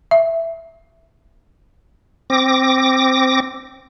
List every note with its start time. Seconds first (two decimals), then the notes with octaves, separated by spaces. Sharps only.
0.11 E5
2.30 C4 D6 A#6